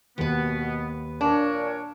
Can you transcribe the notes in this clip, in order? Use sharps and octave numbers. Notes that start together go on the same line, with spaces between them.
D#2 B2 B3 B4
A#2 D4 A#4 C#5